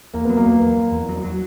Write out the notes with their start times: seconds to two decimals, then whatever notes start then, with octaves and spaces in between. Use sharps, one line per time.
0.14 E2 A#3
0.25 F#3 B3
0.37 A#3
0.46 E2
0.61 E2
0.77 E2
0.92 E2
1.09 F#3
1.25 F#3